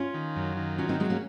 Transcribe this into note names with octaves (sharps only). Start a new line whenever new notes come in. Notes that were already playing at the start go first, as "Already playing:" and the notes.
Already playing: C#4 F4
D#3
F#2
D#3
F#3 C#4 F4
C4 D#4
F#3 G#3 C4
A#3 C#4